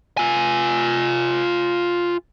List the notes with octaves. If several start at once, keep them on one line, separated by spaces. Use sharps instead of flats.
F4 G#5